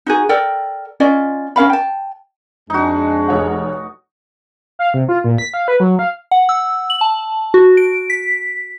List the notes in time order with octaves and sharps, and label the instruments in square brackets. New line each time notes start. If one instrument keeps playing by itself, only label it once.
[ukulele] D#4 F#4 G#4
A4 A#4 D5 G5
C#4 F4 D5 D#5
C#4 A#4 F5 B5
G5 A5
[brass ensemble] F2 G#3 [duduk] D4 [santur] D#4 F#4
[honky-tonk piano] F1 C#5 F#5
[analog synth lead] F5
C3
F4
A#2
B6
F5
B4
F#3
F5
[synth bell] F#5
E6
F#7
A5
F#4
D7
B6